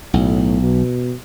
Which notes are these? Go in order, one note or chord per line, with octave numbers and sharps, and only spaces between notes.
B1 A2
B2